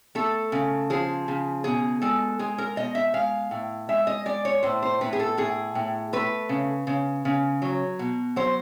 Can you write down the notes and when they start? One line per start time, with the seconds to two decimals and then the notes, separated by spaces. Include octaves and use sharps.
0.15 A3 A4
0.52 C#3
0.90 F3 G#4
1.28 C#3
1.64 B2 G#4
2.02 G#3 A4
2.39 G#3 G#4
2.58 A#4
2.76 B2 D#5
2.95 E5
3.14 G#3 F5
3.51 A2
3.89 G#3 E5
4.07 D#5
4.25 G#3 D5
4.45 C#5
4.63 A2 C5
4.82 C5
5.01 A2 B4
5.13 G#4
5.20 A4
5.37 A2 G#4
5.75 A2
6.13 A3 B4
6.49 C#3
6.87 C#3
7.25 C#3
7.62 F#3
7.99 B2
8.36 F#3 C5